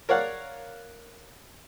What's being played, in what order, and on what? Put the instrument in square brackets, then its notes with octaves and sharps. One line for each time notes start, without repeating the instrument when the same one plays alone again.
[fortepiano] A#4 C#5 D5 F5 F#5